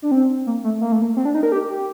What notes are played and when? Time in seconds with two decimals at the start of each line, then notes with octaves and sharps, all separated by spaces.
0.02 D4
0.11 C4
0.46 A#3
0.64 A3
0.81 A#3
0.92 A3
1.02 A#3
1.17 C4
1.25 D4
1.34 D#4
1.43 A#4
1.52 G4
1.69 G4